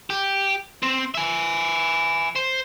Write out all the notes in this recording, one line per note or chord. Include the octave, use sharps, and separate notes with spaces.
G4
C4
E5 G#5
C5